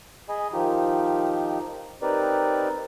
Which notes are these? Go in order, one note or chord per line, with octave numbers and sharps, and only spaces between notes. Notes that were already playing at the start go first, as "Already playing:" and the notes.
G#4 D#5 G#5 B5
D#3 F3 D#4 F4 G4
C4 D#4 G4 A#4 B4 D5